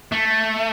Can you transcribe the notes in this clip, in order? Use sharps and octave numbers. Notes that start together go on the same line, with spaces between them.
A3